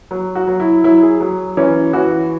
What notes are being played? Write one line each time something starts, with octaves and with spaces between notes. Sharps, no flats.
F#3
F#4
F#3
E4
F#3 E4
G#4
F#3
E3 C#4
E3 F#4